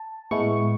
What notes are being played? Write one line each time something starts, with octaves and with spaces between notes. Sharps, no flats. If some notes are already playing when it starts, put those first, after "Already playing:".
Already playing: A5
A2 G#3 B3 E4 C#6